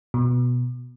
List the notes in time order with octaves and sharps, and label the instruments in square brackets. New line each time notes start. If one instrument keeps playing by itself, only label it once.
[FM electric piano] B2